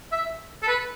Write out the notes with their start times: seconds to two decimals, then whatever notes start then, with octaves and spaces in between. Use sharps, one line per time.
0.12 E5
0.63 A4
0.68 B4